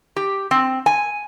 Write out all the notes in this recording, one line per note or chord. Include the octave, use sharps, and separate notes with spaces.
G4
C4
G#5